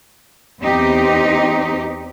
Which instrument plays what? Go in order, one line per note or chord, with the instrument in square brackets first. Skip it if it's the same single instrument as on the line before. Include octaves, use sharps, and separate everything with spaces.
[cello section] E2 C4 D#4 G4